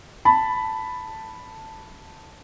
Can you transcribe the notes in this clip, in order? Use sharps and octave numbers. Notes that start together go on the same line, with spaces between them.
A5 B5